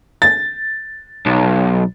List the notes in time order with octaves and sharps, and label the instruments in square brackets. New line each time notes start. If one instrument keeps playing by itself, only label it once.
[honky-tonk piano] A6
[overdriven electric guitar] B1